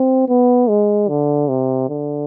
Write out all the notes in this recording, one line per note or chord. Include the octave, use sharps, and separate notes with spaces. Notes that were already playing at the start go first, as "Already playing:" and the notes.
Already playing: C4
B3
G#3
D3
C3
D3